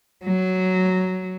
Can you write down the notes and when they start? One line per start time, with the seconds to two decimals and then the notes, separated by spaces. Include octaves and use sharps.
0.25 F#3